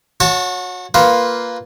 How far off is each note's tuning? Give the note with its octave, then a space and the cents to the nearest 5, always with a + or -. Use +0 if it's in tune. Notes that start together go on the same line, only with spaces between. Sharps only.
F#4 -30 C#5 +0 A5 +0
A#3 +0 F4 +0 B4 +0